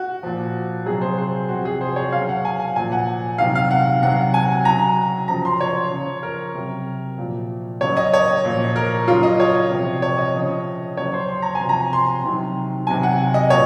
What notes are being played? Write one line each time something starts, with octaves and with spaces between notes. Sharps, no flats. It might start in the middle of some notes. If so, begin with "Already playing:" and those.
Already playing: F#4
A#2 F3
C3 F#3 G#4
C5
C5
C3 F3 F#4
G#4
C5
C#5
C#3 F#3 F5
F#5
G#5
G#5
A#2 F3 G#5
F#5
C3 D#3 F#3 F5
F5
F#5
C3 F#3 F#5
G#5
C#3 F#3 A#5
C#3 F3 A#5
C6
C#5
C#3 F3
A#4
C3 F#3
A#2 F3
C#3 F#3 C#5
D#5
C#5
A#2 F3
A#4
C#3 F#3 F4
D#5
C#5
C3 F3
C#5
D#5
C#3 F3
C#3 F#3 C#5
C5
C6
A#5
G#5
C3 F3
A#5
C6
C3 D#3 F#3
C3 F#3 G#5
F#5
D#5
A#2 C#5